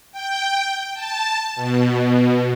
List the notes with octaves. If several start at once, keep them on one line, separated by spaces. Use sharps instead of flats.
G5
A5
B2